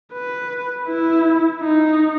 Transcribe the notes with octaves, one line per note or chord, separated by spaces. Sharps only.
B4
E4
D#4